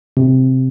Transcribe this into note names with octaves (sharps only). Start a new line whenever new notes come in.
C3